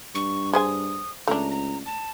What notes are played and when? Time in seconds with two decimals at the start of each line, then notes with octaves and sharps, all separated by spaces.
0.15 G2 C#6
0.53 G#4 C5 G#5 D#6
1.27 C#2 A3 D4 A#5
1.51 A#5
1.86 A5